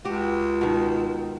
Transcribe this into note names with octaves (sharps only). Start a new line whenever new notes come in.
C#2 F#4 G4
B2 D#3